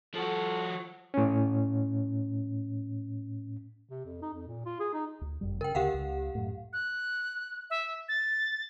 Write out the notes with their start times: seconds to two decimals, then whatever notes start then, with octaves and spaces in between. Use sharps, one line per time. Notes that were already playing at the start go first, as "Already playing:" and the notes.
0.15 F3 F#4 A4
1.14 A2 C#4
3.90 C3
4.05 F2
4.22 D#4
4.34 F2
4.47 A#2
4.66 F4
4.80 G#4
4.93 D#4
5.21 D2
5.41 G1 F#2 G3
5.61 C#3 A#4 G5
5.75 D2 C#3 G4 F5 F#5
5.94 C#2
6.35 F#2 A2
6.73 F#6
7.70 E5
8.09 A6